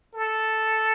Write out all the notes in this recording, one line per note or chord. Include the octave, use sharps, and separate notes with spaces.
A4